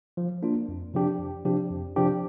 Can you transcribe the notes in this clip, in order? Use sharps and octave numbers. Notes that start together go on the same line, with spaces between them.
F3
A#3 D4 F4
F2
C3 F3 D4 G4
F2
C3 F3 D4 G4
F2
C3 F3 D4 G4